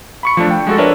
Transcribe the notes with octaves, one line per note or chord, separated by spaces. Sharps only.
B5 C#6 C#7
F3 A3 D4
G5
G#3 F#4 A4
D4 A#4 B4 C#5 E5